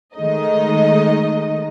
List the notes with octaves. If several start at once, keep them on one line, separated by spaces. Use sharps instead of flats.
D#3 G#3 A3 D#4 D#5